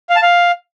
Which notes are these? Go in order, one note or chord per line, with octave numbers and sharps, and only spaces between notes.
F5
A5
F5